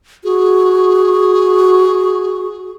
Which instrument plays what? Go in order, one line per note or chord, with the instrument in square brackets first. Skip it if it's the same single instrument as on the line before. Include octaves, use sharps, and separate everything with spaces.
[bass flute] F#4 [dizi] G#4